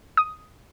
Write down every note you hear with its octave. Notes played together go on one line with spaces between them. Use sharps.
D#6